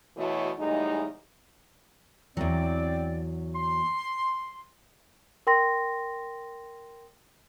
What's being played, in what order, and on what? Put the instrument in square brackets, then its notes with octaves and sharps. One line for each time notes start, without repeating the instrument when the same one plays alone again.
[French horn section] E2 B2 E3 A3 F#4 C#5
E2 A2 G3 G#3 D#4
[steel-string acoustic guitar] E2 F#3 [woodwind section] C4 D5
[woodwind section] C6
[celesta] A#4 G5 C6 A#6